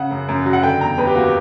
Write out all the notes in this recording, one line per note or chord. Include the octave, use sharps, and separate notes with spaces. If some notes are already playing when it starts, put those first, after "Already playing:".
Already playing: C#3 F#5
F#2
F#2
F#3
F#5
D3 G5
E2 A#5
E2 B4
G4
A#3 F#4
G4